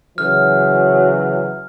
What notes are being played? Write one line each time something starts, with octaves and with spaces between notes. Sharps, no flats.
C#3 E3 F#3 F6